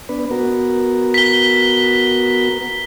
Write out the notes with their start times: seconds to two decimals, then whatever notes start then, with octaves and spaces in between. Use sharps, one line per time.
0.09 B3 D4 B4
0.31 B3 F#4 A#4
1.14 B6 G7